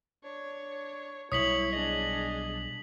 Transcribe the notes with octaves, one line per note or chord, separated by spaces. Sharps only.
D4 C#5
B1 G3 E4 C#5 D#6 B6 F#7
D4 G#4 D#5